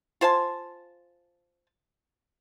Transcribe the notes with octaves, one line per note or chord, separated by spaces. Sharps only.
F4 C5 G#5 A5